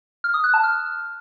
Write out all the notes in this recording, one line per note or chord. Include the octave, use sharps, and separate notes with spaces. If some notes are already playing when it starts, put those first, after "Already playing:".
F6
D#6
F#6
A5
F6